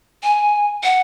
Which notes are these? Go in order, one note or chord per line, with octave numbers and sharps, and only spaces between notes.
G#5
F#5